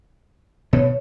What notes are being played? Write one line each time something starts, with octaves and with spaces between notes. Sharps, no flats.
B2 B3 C#5